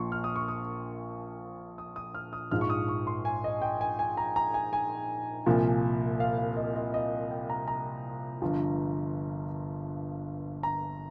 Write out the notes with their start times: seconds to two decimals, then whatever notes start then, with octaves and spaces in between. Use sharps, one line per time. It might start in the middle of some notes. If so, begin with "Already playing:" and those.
Already playing: A#1 A#2 F3 C6 C#6
0.12 F6
0.24 D#6
0.36 C#6
0.48 D#6
1.78 D#6
1.96 D#6
2.15 F6
2.33 D#6
2.51 A#1 G#2 F3 F6
2.61 C#6
2.70 D#6
2.88 C#6
3.07 C6
3.25 G#5
3.44 D#5
3.62 G5
3.81 G#5
3.99 G#5
4.17 A#5
4.36 A#5
4.54 G#5
4.73 G#5
5.46 C2 A#2 F3
6.20 F5
6.38 F5
6.57 D#5
6.76 D#5
6.94 D#5
7.31 G5
7.50 A#5
7.68 A#5
8.42 G1 G2 F3
10.63 A#5